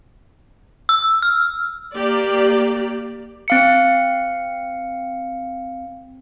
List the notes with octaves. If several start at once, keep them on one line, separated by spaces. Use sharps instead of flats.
E6
F6
A#3 G4 D5
C4 F5 C#7